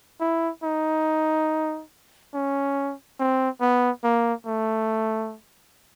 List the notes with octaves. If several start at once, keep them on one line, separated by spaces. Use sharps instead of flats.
E4
D#4
C#4
C4
B3
A#3
A3